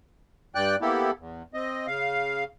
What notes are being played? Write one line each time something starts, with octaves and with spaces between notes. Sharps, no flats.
G2 D5 G5 F#6
A#3 B3 E4 G4 A4
E2
C4 D#5
C#3 F5